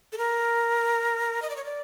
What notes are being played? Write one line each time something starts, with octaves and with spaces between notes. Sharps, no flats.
A4
A#4
D#5
D5
C#5
D5